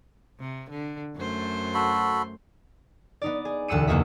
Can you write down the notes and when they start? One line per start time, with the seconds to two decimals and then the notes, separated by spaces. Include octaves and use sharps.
0.40 C3
0.70 D3
1.16 F#2 A3 C5
1.74 F#4 A4 B5
3.22 B3 D#4 D5
3.45 G#4
3.68 E1 D2 F#5 E6 C#7 D#7
3.88 F#1 E2 A#3 F#4 D#5 E5